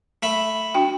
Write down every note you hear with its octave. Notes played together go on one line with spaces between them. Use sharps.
A3 E5 B5
D4 F#4 G5